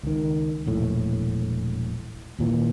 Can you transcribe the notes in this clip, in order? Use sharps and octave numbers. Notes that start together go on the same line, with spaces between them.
C#2 D#3
E1 A#1 A2
D#2 A#2 E3